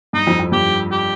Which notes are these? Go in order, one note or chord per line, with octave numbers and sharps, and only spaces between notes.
G2 D#4
F2
F2
G2 G4
G4